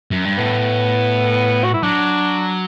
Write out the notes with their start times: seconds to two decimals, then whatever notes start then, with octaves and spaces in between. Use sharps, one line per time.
0.11 F#2
0.25 G2
0.38 A2 B3
1.64 F#4
1.74 E4
1.83 F#3 D4